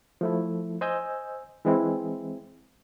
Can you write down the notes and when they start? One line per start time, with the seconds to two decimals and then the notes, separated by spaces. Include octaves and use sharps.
0.21 F3 A3 E4
0.81 C5 D#5 G#5 E6 G6
1.65 E3 G#3 C4 E4